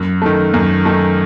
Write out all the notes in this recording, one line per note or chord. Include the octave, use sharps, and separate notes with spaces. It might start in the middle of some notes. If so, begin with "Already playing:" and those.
Already playing: F#2
D#3 A3
F#2
D#3 A3